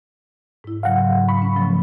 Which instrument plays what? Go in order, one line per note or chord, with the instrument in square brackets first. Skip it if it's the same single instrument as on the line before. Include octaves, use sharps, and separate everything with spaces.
[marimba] G#2 E4
[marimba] G#2 C#3 F#3 [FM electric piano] F5 F#5
[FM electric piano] B5 C#6
[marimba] C#4
C#3 F3 A3